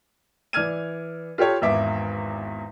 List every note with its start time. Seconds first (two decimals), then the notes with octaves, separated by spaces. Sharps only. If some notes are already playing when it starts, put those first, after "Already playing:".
0.53 E3 D5 F6 G#6 D#7
1.38 F4 G4 A4 C#5
1.62 G#1 E2 E5 D6